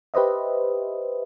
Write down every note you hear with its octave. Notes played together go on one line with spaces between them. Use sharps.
G4 B4 C5 D#5 E5